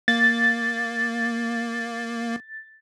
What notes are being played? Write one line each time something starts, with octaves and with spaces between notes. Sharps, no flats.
A#3 A6